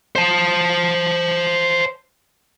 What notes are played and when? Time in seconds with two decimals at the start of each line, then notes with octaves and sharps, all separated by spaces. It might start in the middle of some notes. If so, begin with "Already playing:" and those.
0.16 C5 A5